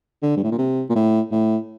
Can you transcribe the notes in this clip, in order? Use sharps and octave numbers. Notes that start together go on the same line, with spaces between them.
D3
G2
A2
A#2
C3
A#2
A2
A2